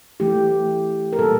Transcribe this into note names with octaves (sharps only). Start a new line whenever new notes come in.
E3 A3 E4 G4
A#4
A#2 G3 A#3 A4